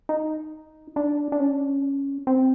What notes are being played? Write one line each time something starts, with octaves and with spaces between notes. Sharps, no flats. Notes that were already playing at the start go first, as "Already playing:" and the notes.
D#4
D4
D4
C#4
C4